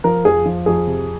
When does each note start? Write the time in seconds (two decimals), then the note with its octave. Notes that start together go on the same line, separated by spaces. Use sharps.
0.04 F3 A#4
0.25 F2 G#4
0.46 F3
0.66 F2 G#4
0.87 C3